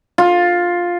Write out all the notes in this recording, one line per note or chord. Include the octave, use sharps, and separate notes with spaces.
F4